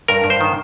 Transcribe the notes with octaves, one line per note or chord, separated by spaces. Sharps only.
G2 A#4
G2
C5
D#3